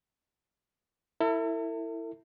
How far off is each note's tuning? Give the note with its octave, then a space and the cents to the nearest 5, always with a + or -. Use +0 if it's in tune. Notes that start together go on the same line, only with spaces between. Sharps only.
E4 +0 A4 +45